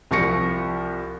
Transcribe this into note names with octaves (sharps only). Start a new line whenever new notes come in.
C2 F3 C#6 A#6 C#7